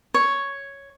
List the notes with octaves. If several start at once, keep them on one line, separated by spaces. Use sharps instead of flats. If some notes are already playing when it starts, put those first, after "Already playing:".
C#5